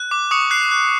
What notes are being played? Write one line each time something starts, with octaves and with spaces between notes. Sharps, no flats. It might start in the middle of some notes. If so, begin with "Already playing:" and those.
Already playing: F#6
D6
C#6 D#6 C#7
F#6 C7
F#6